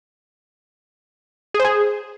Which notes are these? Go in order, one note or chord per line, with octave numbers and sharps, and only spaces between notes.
G#4
C5
G#4